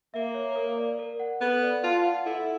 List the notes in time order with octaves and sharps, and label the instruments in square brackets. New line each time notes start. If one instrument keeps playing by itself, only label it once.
[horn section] A#3 [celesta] E5
[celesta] C#5
A#4
D5
A#4
F#5
[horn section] B3 [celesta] A4
[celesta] D5
[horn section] F4 [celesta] A5
[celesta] F#5
[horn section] E4 [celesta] A4